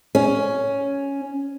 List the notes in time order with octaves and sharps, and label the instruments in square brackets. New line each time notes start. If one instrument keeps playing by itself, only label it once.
[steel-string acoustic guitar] C#4